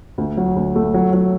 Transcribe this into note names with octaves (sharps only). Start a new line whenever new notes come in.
D2
F#3
D2
A3
F#3
F#3